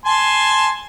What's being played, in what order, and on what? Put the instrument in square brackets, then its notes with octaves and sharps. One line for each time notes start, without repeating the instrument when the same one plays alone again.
[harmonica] G#5 A5 C6